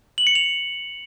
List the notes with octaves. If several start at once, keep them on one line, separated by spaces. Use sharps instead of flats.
F#7
C#7
F7